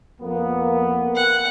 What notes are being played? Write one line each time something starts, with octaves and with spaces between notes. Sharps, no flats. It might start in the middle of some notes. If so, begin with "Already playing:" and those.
F2 A#3 B3
F#5